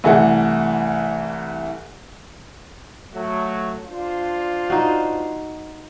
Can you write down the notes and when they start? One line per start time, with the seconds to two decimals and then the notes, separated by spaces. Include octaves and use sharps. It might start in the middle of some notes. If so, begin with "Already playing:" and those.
0.04 C2 E3 A3 F#5
3.15 F#3 A3 F#4
3.85 D4 F4 C5
4.70 D#4 F#4